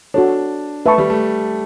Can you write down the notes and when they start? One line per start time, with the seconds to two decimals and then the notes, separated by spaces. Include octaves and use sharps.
0.14 D4 F#4 A4 C#5
0.86 A3 B4 E5 A5 C#6
0.98 G3
1.10 A3